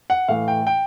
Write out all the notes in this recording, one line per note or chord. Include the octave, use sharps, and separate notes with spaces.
F#5
A2 E3 A3 F5
G5
G5